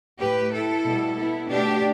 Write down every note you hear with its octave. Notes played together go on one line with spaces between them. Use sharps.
A2 A3 G4 B4
E4 A4
B2 G3 B3
B3 E4
B2 A3 D4 G4